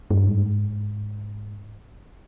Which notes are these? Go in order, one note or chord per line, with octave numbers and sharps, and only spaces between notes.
G2
G#2